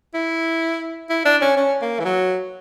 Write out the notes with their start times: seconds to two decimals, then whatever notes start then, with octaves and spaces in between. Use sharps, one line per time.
0.14 E4
1.10 E4
1.25 D4
1.41 C#4
1.57 C#4
1.82 A#3
1.99 E3
2.05 F#3